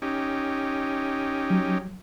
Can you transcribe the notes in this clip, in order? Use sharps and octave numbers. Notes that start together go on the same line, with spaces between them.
C#4 D#4 G4
F#3